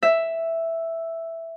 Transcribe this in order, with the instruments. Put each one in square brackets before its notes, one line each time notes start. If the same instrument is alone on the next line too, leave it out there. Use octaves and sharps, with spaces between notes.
[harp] E5